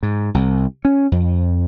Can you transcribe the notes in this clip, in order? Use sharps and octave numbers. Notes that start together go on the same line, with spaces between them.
G#2
C2
C#4
F2